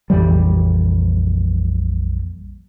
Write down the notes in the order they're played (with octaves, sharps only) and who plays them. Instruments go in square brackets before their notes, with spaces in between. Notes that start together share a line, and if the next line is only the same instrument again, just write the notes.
[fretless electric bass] A#1 F2 E3 G3